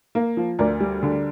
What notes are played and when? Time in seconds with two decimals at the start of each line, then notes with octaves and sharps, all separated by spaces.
0.15 A#3
0.37 F3
0.59 D2 A#4 D5
0.80 G3
1.03 D3